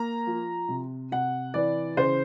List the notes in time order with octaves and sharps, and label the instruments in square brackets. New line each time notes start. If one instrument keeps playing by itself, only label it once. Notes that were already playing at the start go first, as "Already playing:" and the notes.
Already playing: [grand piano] A#3 A#5
F3
C3
C3 F#5
E3 D5
C#3 C5